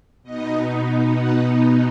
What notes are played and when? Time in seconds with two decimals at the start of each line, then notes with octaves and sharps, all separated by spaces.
0.23 B2 B3 D#4 D#5
1.16 F#5